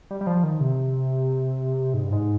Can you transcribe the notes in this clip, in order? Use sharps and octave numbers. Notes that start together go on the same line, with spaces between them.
G3
G3
F3
D#3
C3
G#2
G2
G#2